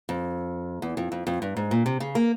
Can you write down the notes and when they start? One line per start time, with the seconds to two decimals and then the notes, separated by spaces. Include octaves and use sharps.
0.09 F2
0.82 E2
0.97 F2
1.12 F2
1.27 F2
1.42 G2
1.57 G#2
1.71 A#2
1.86 C3
2.00 C#3
2.15 A#3